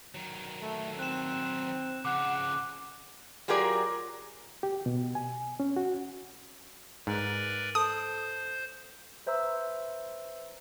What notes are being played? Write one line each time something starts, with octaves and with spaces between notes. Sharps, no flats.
D#3 F#3
A3
C4 F#6 E7
C#3 F3 F#5 D6 F#6
F#3 F4 G4 G#4 A#4 D5
G4
B2
G#5
C#4
F#4
G#2 A#4 B4 D5
A4 C5 D#6
B4 C5 E5 A#5 E6